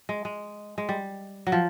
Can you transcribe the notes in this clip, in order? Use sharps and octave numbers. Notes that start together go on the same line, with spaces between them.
G#3
G#3
G#3
G3
F#3
F3